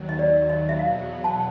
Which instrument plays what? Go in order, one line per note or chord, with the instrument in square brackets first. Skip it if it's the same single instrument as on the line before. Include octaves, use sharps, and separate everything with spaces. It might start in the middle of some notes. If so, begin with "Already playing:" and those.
Already playing: [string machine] D#2 D#3 F#3
[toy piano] D#5
D5
D#5
E5
[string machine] E2 B2 F#3 B3 [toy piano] F5
[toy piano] A5